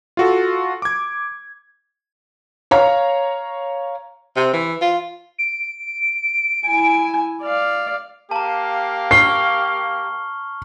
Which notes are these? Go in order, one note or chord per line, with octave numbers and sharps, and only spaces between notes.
F4 F#4 A4
D6 G#6
C#5 F5 A#5
C3
E3
F4
D7
E4 G#5
D5 F5
A#3 G4 F5 A5 A#5
C#6 F6 C7 G7